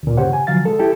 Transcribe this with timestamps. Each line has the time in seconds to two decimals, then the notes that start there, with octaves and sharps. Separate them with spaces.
0.03 D2 A#2
0.17 G2 C#3 G4 C5 C#5 F#5
0.33 G#5
0.47 D3 F3 F#3 F5 A6
0.65 G#3 A4
0.79 E4 G4 A4 G5